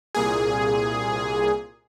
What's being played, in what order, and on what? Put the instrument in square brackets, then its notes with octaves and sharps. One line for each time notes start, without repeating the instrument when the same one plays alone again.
[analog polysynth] C2 A#2 G#4